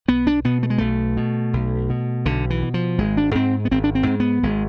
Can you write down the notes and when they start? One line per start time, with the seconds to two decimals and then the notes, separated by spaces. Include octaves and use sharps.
0.08 B1 B3
0.27 D4
0.44 B2 B3
0.63 A3
0.70 G#3
0.78 B1 A3
1.17 B2
1.53 B1
1.90 B2
2.26 B1 D3
2.50 E3
2.63 B2
2.74 F3
2.98 G#1 G#3
3.17 D4
3.35 G#2 C4
3.65 B3
3.71 G#1 C4
3.84 D4
3.95 C4
4.07 G#2
4.20 B3
4.43 G#1 G#3